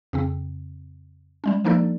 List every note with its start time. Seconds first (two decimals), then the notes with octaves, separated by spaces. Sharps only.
0.13 F2 C#3 C4
1.44 G3 G#3 C#4
1.64 F3 A#3 D4 D#4 A4 D5